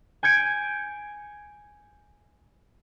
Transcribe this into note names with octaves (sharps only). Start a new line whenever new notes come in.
G#5 G6 G#6 C#7 D7